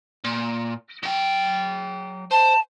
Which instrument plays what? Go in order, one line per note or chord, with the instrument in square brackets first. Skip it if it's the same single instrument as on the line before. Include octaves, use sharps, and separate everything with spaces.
[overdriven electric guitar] A#2
F#3 G5
[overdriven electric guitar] C5 [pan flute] A5